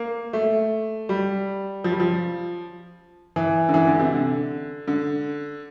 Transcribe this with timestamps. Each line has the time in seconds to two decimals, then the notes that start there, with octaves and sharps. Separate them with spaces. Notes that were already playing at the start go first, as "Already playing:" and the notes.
Already playing: A#3
0.33 A3
1.09 G3
1.84 F3
1.92 G3
2.00 F3
3.36 E3
3.69 D3
3.74 E3
3.87 D3
3.99 C3
4.12 D3
4.88 D3